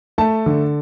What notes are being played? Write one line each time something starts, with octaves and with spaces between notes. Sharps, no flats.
A3 A5
D3